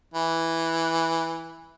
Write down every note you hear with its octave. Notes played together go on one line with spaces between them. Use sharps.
E3